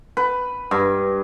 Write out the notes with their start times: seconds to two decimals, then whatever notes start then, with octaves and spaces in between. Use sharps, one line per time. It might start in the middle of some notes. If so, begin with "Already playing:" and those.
0.17 B4
0.71 G2